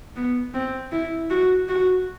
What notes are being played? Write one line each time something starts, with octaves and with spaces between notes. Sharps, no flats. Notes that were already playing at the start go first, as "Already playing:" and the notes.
B3
C4
E4
F#4
F#4